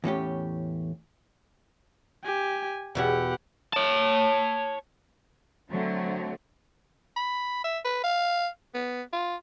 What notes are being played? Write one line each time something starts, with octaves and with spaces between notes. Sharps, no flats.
E2 A2 C#4 G4
G4 G#5
E2 B2 E4 G4 F#5
C#5 A5
D3 F#3 A3 C4
B5
E5
B4
F5
B3
F4